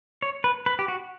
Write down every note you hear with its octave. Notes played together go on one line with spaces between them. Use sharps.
C#5
B4
B4
G4
F#4